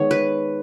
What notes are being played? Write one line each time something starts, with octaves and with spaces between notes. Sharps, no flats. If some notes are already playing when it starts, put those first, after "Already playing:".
Already playing: D#3 G#3 B3 C#5
B4